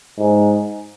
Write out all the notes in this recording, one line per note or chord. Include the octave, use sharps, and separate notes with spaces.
G#2